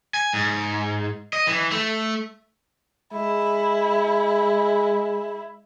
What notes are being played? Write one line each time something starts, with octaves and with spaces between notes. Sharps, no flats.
G#5
G#2
D#5
E3
A3
G#3 E4